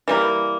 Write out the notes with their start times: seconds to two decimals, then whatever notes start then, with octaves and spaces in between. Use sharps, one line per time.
0.08 E3 G3 A#3